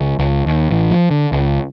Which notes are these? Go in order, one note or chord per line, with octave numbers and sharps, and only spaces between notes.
C#2
C#2
D#2
A1
F3
D3
C#2